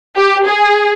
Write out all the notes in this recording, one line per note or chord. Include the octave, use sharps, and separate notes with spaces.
G4
G#4